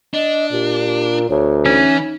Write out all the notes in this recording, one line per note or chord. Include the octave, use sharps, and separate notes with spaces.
D4 D#5
A#2 G4
D2 C#5
E3 C#4 D#4 E5